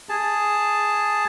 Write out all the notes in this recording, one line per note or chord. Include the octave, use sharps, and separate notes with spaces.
G#4 A5